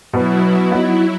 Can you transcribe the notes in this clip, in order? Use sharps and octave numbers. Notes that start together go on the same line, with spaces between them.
B2 F#3 E4 B4
B3 D#4 F#4